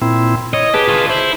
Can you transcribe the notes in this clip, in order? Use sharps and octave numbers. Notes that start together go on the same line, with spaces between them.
A#2 C4 E4
C#5 D#5
G4 G#4 B4 A5
F4 C#5
E4 C5